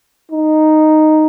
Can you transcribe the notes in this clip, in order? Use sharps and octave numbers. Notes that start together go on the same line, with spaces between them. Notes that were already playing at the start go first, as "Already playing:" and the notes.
D#4